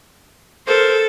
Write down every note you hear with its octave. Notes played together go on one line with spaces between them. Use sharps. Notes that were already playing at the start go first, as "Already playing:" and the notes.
A4 A#4 C5